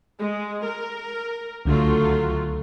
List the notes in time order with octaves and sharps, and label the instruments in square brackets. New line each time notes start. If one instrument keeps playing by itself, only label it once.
[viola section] G#3
A#4
[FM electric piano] C#2 D3 [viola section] F#3 A3 F4